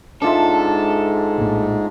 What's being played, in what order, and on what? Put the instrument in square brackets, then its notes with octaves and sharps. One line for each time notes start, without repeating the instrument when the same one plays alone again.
[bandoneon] G#2 G#3 [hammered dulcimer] D4 F4 E5 [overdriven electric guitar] A4
[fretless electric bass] A#1 A2